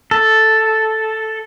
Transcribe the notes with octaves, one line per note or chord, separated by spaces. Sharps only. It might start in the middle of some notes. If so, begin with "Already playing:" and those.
A4